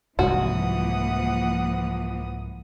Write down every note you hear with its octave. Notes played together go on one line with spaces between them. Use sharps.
C2 G#2 E3 F3 A#3 F#4 F#5 D#6